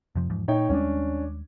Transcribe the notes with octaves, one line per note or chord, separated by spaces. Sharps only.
F2 C3 F3
E2 G#2 F3
A#2 D#4 C#5 G5
D#2 G3 G#3 C#4 D4